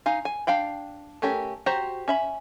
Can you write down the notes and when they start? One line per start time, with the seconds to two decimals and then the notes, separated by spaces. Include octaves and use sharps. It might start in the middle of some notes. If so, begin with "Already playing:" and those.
0.06 D#4 F5 G#5
0.25 G#5
0.47 D4 F5 G5 B5
1.22 A3 C#4 G4 A#4
1.66 F#4 G4 C5 A#5
2.08 C#4 E5 B5